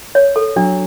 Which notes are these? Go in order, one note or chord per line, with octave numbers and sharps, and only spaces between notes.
C#5
A4
F#3 D4